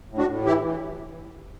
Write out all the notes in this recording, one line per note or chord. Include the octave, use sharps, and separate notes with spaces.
A2
D4 F#4
A2
E3 E4 G4
E3